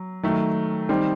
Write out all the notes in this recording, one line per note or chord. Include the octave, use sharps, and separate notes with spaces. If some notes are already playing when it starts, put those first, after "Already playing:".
Already playing: F#3
D#3 F#3 A3
D#3 G3 C4 D#4